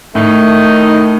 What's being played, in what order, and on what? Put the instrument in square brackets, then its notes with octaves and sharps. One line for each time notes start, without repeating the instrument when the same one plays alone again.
[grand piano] A2 [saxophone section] D#3 A3 D#4